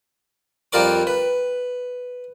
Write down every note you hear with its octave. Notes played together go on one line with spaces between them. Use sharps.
F2 G3 F4 A#4 D5 D6
B4